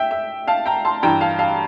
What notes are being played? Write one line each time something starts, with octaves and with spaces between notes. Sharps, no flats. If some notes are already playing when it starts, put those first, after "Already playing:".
Already playing: E5 G5
E5
F5 A5
G5 A#5
A5 C6
G2 E3 G5 A#5
F5 A5
F5 A5